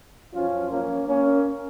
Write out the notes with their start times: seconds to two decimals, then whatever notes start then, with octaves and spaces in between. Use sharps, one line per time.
0.34 F#2 F3 C#4 F4
0.71 A#3 C#4
1.08 A#3 C#4